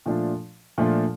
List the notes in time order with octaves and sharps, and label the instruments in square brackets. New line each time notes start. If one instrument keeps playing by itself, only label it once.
[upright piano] A#2 F3 A3 D4 F4
A#2 F3 A3 D4 F4